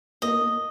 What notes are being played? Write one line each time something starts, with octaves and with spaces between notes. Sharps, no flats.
A#3 D#5
A#3